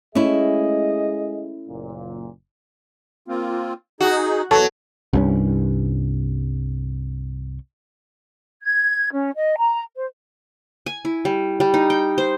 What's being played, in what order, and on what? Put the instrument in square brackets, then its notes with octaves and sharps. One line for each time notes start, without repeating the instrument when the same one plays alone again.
[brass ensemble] G#3 G#4 D#5 [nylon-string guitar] A3 E4 [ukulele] C#4
[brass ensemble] F#1 A#2
[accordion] A#3 C4 F4
[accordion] D#4 G#4 [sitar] F#4
[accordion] E2 E3 [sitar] F#3 [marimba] A4 A5 C#6
[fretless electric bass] C2 G2 C#4
[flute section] G#6
C#4
D#5
A#5
C5
[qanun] G#5
E4
G3
G3
D#4
G5
C5